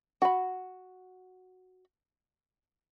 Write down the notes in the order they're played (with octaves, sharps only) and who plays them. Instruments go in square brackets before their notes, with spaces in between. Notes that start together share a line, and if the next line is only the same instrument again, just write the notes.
[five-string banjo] F#4 B5